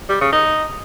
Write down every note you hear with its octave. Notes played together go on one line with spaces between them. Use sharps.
G3
C#3
D#4